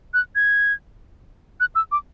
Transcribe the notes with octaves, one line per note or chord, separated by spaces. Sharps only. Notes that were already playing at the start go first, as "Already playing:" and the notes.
F#6
G#6
F#6
E6
D6